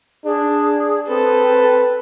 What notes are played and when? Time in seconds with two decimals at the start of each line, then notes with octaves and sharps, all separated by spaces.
0.25 D4 G#4
1.08 C4 A4 B4